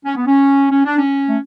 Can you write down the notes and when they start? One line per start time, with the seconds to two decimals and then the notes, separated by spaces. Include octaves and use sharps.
0.05 C#4
0.16 B3
0.27 C#4
0.71 C#4
0.85 D4
0.98 C#4
1.28 A3